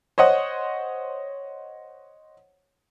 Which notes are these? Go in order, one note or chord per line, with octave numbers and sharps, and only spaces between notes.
C5 C#5 D#5 F#5